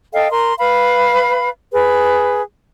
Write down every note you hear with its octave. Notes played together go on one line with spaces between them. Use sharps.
A4 D#5 F5 G5
A#4 C6
B4 F5 B5
G#4 B4